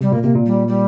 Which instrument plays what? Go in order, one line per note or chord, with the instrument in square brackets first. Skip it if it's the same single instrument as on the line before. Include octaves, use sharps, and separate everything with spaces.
[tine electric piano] C3 [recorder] G3
[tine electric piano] A#2 [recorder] A#3
[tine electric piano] C3 [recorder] A#3
[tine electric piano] A#2
[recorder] G3
G3